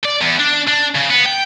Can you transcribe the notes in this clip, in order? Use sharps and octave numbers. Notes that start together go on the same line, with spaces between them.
D5
E2
D4
D4
C#3
B3
G5